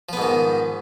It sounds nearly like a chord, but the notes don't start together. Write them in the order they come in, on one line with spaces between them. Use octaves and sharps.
F3 B3 G#2 D#3